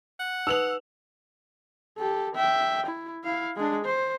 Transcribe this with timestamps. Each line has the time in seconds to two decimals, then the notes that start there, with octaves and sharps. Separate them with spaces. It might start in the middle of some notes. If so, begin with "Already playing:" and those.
0.20 F#5
0.47 D#4 B4 D#6 E6 F7 F#7
1.98 G4 A4
2.35 E5 G5
2.86 E4
3.24 E4 F5
3.56 G#3 D4
3.85 C5